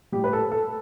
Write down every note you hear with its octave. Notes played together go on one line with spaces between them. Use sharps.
A2 G3 G4
B4
A4
A4